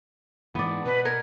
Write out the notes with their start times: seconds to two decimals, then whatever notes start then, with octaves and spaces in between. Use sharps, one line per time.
0.55 G#2 E3 B3 D5
0.86 B2 B4
1.05 A#4 G#6